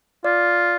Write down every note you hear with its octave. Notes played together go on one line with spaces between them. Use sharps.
F4 D5